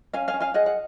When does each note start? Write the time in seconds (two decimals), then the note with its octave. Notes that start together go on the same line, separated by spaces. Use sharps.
0.13 C#4 F5 G#5
0.28 F5 G#5
0.34 C#4
0.40 F5 G#5
0.54 G#4 D#5 F#5
0.66 F#5